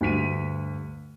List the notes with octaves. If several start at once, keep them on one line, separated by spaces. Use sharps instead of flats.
D2 G2 B6 D#7